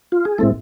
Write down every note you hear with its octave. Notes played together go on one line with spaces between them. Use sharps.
F4
G#4
A2 G#3 A3 C4 E4 A4